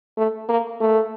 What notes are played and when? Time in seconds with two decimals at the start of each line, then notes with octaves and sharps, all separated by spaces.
0.17 A3
0.49 A#3
0.81 A3